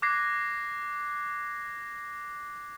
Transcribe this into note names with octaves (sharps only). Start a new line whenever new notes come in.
D6 F#6 G#6 A#6 C7